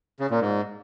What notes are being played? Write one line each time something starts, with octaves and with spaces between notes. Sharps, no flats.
C#3
A#2
G#2